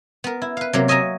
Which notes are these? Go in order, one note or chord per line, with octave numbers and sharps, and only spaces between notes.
B3 A#4
E4
B4 F5
C3 F#3 A#3 A#4
C#5 D#5 E5 G#5 A#5